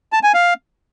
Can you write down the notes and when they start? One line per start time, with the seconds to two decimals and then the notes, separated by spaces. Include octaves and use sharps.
0.12 A5
0.23 G#5
0.34 F5